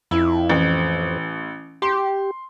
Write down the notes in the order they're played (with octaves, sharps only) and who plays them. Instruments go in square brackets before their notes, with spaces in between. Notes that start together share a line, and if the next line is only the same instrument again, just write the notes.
[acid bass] F2 [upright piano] E4
[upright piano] A1
[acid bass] G4 [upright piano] C6